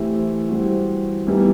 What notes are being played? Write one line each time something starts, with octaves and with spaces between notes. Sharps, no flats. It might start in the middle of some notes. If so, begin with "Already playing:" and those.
Already playing: E3 A3 C4 E4 G4
E3 G3 C4 F#4
E3 G3 B3 D#4